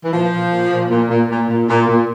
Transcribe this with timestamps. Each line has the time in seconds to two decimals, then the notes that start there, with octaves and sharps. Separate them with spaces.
0.04 E3
0.12 A#2 F3
0.31 A#2
0.51 A#2
0.70 A#2
0.90 A#2
1.10 A#2
1.29 A#2
1.49 A#2
1.68 A#2
1.88 A#2